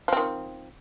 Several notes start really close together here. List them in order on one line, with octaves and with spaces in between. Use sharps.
F3 C4 D#3